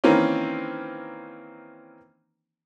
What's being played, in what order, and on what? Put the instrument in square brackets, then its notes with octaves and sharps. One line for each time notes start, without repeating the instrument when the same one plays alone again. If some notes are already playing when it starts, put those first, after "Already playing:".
[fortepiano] D#3 E3 A#3 C4 C#4